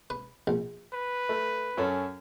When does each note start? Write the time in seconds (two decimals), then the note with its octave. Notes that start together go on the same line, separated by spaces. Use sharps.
0.10 B4
0.47 A#1
0.93 B4
1.29 A3
1.77 F#2 C#4 A4